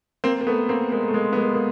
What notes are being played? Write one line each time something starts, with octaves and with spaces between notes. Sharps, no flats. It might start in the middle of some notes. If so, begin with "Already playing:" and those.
A#3 C4
A#3
A3 B3
A#3 C4
G#3 A#3
A3
G#3 A#3
B3
G#3 A#3
A#3